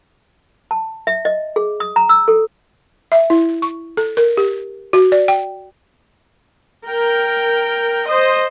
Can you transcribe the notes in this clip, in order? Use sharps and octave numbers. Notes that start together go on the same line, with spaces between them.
A5
E5
D#5
G#4
D#6
A#5
E6
A4
E5
E4
C#6
A4
A#4
G4
F#4
D5
G5
A#4 G5
C5 D#5